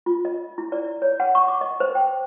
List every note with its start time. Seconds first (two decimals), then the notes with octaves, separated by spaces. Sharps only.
0.06 F4
0.25 D#5
0.58 E4
0.72 D5
1.02 C#5
1.20 F#5
1.35 C#6
1.48 D6
1.61 D#5
1.80 C5
1.95 G5